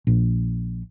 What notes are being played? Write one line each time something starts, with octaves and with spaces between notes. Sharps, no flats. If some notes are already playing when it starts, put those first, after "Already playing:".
A#1